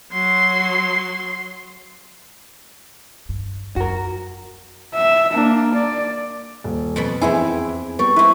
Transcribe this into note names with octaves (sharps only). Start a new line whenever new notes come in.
F#3 C6
G2
F#2 F#4 A#4
E5
A#3 D4
D5
D#1
F2 B2 B5
E2 B3 C4 E4 G#4 G#5
G3 B3 C#6
C4 E4 B4